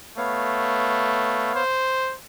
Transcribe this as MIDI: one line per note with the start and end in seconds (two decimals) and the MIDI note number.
0.18 1.51 57
0.18 1.63 59
0.18 1.63 73
0.18 1.63 77
1.55 2.15 72